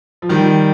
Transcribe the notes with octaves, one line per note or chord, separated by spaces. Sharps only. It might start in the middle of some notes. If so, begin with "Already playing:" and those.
F3
D#3 G3